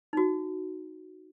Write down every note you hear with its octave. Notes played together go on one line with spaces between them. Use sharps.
D#4 F#4